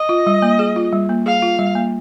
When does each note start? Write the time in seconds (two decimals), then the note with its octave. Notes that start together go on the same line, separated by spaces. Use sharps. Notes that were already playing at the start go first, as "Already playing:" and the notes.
Already playing: D#5
0.09 F4
0.27 G3
0.42 A#3
0.59 G#4
0.76 F4
0.92 G3
1.09 A#3
1.26 G#4 F5
1.42 F4
1.59 G3
1.75 A#3